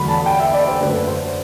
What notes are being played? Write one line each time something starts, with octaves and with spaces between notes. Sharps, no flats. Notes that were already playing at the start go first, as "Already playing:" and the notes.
Already playing: E2 D3 F#3 A3 B5
A5
G5
E5
D5
C5
F#2 D3 A3 B4
C5